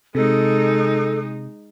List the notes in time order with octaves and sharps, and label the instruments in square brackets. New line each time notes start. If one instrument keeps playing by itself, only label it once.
[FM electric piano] C3 [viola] G#3 D#4 [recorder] A4